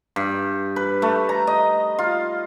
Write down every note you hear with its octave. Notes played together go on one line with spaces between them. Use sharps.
G2
B4
A3
A#5
D#5
F4